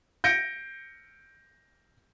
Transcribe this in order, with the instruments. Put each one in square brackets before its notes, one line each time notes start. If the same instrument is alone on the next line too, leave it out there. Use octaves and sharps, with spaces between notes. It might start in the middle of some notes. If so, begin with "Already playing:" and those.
[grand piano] G6 A#6 C#7 D7